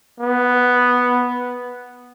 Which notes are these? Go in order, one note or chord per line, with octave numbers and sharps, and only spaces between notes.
B3